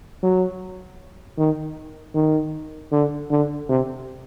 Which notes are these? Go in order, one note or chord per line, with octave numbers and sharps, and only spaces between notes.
F#3
D#3
D#3
D3
D3
C3